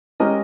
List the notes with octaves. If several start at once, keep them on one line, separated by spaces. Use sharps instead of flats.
G#3 C#4 G4 A#4 D#5